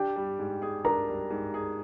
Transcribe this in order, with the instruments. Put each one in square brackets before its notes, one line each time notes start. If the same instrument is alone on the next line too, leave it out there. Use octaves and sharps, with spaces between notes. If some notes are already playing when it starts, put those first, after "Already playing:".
Already playing: [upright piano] D4 [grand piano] G4 G5
[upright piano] G3
G#2
G#4
[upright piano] D4 [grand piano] A#4 A#5
[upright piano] G3
G#2
G#4